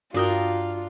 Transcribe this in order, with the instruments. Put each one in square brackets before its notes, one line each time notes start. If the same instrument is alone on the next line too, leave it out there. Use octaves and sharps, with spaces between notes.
[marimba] G2 F#4 D#6 [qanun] D4 A#4 G5 [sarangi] F4